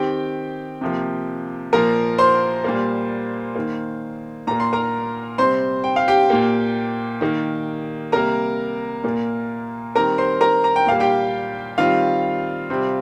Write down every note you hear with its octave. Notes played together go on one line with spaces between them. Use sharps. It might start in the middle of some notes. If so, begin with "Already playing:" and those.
Already playing: D#3 C4 G4 G5
C3 F3 A#3
A#2 F3 A#3 A#4 A#5
C5 C6
A#2 G3 A#3
D#3 A#3
A#2 A#3 A#5
C6
A#4 A#5
C3 G3 C4 C5 C6
G5
F5
G4 G5
A#2 A#3
D#3 A#3
C3 G3 A#3 A#4 A#5
A#2 A#3
D#3 G3 C4 A#4 A#5
C5 C6
A#4 A#5
A#5
G5
A#2 G3 A#3 F5
G4 G5
D#3 G3 C4 F4 F5
C3 G3 C4